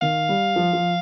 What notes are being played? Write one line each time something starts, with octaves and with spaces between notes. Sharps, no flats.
D#3 F5
G3
F3
F3